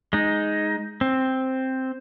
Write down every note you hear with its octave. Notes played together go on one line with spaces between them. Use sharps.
G#3 D#4
C4